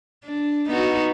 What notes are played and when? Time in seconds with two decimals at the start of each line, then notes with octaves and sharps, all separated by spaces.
0.24 D4
0.68 B3 D#4 F#4